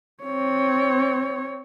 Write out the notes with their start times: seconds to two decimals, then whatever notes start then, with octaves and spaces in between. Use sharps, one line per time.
0.24 C4 C#5